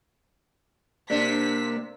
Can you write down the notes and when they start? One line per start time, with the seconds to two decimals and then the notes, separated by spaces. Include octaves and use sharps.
1.10 C3 A#3 D4 B6